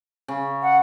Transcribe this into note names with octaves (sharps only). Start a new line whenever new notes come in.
C#3
F#5